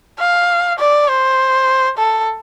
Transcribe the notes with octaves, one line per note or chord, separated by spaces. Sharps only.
F5
D5
C5
A4